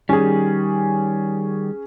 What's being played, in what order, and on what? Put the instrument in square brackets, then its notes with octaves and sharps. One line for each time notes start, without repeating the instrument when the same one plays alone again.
[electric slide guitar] D#3 G3 [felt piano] C#4 G#4